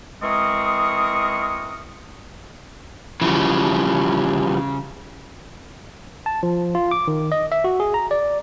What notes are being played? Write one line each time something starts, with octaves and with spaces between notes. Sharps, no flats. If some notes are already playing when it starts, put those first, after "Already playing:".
E3 G#3 C4 A#4 C#6 D#6
C#3 E3 F3 G3
A5
F3
F4
D6
D#3
D#5
E5
F#4
G#4
A#5
D5